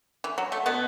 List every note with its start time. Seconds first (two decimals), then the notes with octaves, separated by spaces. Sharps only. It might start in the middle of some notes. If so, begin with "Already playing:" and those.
0.24 E3
0.38 F#3
0.52 A3
0.66 B2 B3